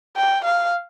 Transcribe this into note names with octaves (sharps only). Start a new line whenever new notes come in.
G5
F5